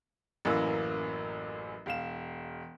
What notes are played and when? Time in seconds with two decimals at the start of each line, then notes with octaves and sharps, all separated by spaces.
0.45 A1 F#2 E3 F#3 A#3 E6
1.86 E1 F5 E7